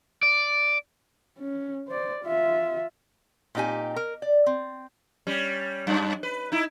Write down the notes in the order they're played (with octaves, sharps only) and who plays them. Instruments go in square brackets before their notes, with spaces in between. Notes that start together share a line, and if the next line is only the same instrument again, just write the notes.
[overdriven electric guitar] D5
[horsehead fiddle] C#4
C5 D5
F4 E5
[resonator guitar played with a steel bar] A#2 C4 D#4 G4 G#5
A#4
D5
C4
[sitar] G3 C#4
F#2
B4
D#4 E4